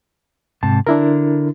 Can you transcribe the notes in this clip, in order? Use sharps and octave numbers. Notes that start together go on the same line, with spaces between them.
G#2 C3 A5
D3 D4 E4 A#4